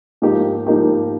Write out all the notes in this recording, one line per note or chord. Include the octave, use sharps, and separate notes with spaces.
G#2 F3 A#3 D#4 G4
G#2 F3 A#3 D#4 G4